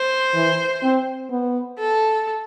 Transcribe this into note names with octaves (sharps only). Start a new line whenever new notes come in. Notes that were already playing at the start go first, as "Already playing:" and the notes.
Already playing: C5
E3
C4
B3
A4